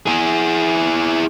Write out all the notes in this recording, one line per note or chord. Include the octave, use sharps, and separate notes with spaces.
E4 G#4